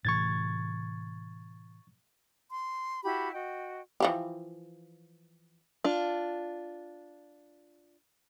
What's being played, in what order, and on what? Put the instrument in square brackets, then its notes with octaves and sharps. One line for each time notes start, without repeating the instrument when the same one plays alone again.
[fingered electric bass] A2 C3 E3 [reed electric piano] C#6 G#6 A6
[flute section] C6
E4 F#4 G4 B5
F#4 D#5 G5
[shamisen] E3 F3 G4
[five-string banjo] D4 F4